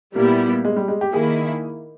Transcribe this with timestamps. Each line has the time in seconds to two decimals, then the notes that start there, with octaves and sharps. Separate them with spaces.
0.16 A#2 G3 A#3 B3 E4
0.65 G#3
0.76 G3
0.88 G#3
1.01 G4
1.13 D#3 A#3 E4 G#4